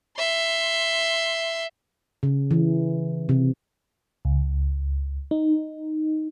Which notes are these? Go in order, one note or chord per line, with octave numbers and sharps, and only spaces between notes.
E5 C6
C#3
E3
C3
C#2
D#4